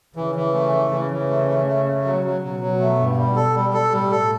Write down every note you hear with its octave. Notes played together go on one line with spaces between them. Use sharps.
C#3 E3
E3
A3
E3
C#3 E3
E3
A3
A3
A3
A3
F#3
F#3
B2 F#3
F#3
A3
G2
G3
A4
G3
A4
A2 G3
A4